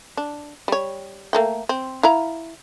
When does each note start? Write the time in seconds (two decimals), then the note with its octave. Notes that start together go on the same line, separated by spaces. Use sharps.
0.17 D4
0.68 G3 C#5
1.33 A3 A#3 G5
1.69 C4
2.03 E4 F5 A#5